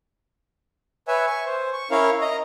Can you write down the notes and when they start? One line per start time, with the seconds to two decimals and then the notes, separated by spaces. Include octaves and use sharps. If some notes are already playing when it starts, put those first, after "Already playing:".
1.08 B4 C#5 E5 G#5
1.27 G#5 C#6
1.46 C5
1.73 C#6
1.91 C#4 E4 A#4 C#5 F5
2.21 D#5 A#5